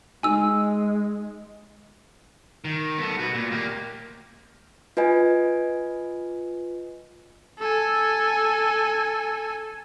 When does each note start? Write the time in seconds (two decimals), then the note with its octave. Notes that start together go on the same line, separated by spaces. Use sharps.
0.23 G#3 D#4 G#5 E6
2.65 D#3
2.98 B3 A4
3.19 F#4 B4
3.34 A#2
3.52 A#3 G4
4.97 F4 B4 D#5 G#5
7.59 A4 G#5